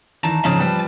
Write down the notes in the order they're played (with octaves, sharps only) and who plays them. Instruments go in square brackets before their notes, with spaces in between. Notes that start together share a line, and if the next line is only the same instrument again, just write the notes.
[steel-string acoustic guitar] E2 D#3 E3 [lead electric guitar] A5 [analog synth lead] A#5
[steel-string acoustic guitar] E2 F3 C4 [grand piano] G#2 C#3 [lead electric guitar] A5
[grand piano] G3 [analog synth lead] B4